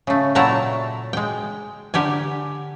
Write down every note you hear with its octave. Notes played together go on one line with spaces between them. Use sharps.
C#3 A3
A#2 F#3 A3 E4 A5 A#5
G#3 G5
D3 G4 A#4 G#5